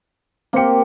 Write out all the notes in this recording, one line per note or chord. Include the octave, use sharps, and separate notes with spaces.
A#3 C4 G4 C5 C#7